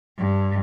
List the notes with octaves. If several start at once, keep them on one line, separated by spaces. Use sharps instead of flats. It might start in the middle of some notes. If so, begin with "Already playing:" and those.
G2